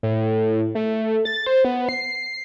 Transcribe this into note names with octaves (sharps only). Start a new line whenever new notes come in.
A2
A3
A6
C5
B3
C7